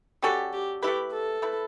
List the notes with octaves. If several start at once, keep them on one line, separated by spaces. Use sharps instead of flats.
G3 C#4 F#4 G4 A4
G4
A3 E4 G4 B4
A4
A3 E4 B4